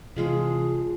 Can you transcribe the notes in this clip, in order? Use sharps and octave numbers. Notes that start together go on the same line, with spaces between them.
C3 E3 F3 G#3 F4 G#4